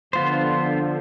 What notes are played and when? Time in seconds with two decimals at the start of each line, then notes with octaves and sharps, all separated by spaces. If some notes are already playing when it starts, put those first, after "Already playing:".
0.13 D3 F3 B3 F4 C5